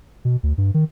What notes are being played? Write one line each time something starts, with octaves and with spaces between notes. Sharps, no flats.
B2
D2
G2
D#3